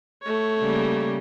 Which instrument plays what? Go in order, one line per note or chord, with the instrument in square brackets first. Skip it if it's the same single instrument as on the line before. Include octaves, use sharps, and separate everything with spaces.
[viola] A3 C#5
[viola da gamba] C#3 G3 A#3